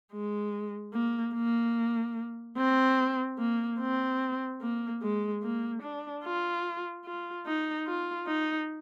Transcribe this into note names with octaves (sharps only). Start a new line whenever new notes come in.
G#3
A#3
A#3
C4
A#3
C4
A#3
G#3
A#3
D4
F4
F4
D#4
F4
D#4